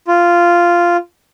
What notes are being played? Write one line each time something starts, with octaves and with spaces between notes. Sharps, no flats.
F4